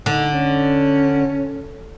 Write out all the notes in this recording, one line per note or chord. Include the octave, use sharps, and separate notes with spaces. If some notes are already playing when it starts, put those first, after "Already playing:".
D3 D#4
C#4